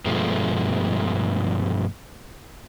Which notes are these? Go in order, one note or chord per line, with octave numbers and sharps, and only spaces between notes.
G2 B2 F3 G#3 A3